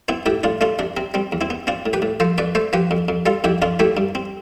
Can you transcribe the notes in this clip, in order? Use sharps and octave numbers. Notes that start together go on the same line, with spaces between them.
B3 C4 E4
A2 E4 G4
A2 D4 F4
A3 D4 F4
C3 D4
C3 C4
G3 C4
E2
C4 E4
B3
C4 D4 F4
A2
G4 B4
A2
F3 A4 C5
F2 B4 D5
A3 A4 C5
F3 G4 B4
F2
F2
G3 F4 A4
F2 E4 G4
F2 D4 F4
A3 E4 G4
G2
C4